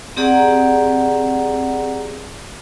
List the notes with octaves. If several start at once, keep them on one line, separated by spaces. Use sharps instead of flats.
C4 G4 G#4 D5 F#5 A#5